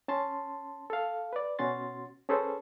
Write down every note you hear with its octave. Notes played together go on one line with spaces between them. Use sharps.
C#4 A5 C6
A4 F5
B4 D5
B2 C#4 F#4 C6 A6
C#4 G#4 A4 B4 C5